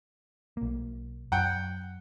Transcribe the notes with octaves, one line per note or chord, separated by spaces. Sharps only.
B1 A#3
F#2 F#5 G5